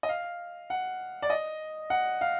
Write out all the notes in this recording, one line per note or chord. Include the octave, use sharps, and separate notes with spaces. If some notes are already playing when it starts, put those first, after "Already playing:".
D#5
F5
F#5
D5
D#5
F#5
F5